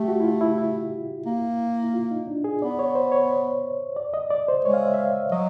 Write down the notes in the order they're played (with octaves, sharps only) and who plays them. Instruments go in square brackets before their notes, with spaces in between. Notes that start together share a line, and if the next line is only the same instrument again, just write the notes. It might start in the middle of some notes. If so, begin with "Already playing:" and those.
Already playing: [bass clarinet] A3 [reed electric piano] G4
[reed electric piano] F#4
E4
F4
E4
E4
[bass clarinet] A#3
[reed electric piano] E4
F4
D#4
D4
G#4
[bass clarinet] B3 [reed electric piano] D5
[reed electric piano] C#5
C5
C#5
D5
D#5
D5
C5
[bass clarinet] G#3 [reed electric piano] C#5
[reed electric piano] F5
E5
E5
F5
E5
[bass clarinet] F#3 [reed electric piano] D#5